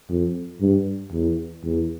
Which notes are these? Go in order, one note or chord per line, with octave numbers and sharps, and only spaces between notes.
F2
G2
E2
E2